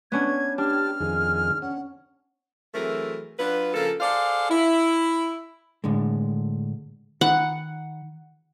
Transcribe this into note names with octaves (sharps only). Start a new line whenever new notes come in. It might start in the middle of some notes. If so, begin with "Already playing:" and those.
B3 C#4 D4 G#6
D4 G4 A5 F6
F2 D#3 G#4
C#4 F#5
E3 F#3 A3 C4 G#4 A#4
F#3 D4 F4 B4
C#3 F3 A#3 A4
G#4 A4 C5 D5 F5
E4
A2 D3 G#3
D#3 D#4 F#5 B5